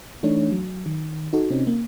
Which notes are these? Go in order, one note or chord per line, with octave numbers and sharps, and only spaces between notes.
E3 A3 D4 D#4 C#5
F#3
D#3
D#4 F#4 A4
C3 C4 C#4 D#4
A#3